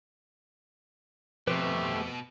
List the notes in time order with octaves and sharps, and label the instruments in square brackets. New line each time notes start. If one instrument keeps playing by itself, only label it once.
[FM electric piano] F2 [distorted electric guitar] B2 [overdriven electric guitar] A3 G4 [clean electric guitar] B4 C5